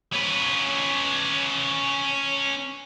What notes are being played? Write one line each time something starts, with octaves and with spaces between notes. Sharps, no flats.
C#4 B4